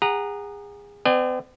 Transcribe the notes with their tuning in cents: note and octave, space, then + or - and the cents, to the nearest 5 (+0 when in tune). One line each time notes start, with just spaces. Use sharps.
G#4 -30 F#5 +0 A#5 +0
C4 -45 D5 +40 G#5 -10